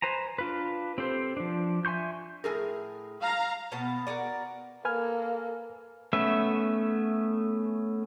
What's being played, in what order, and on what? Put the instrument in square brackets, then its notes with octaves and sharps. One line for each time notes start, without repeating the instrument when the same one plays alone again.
[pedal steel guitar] B4 C5 G#5 A#5
D4 F4 B4
C4 G4 A4 C5
F3 D4
E5 G#5 C6 C#6 G6
[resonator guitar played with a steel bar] A2 G#4 A#4
[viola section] F5 A#5
[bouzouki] B2 B3 A5
F#4 G#4 A#4 D5
[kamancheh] A#3 A4 [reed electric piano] B4 G#5 F6
[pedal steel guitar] A3 B3 C#4 B4 E5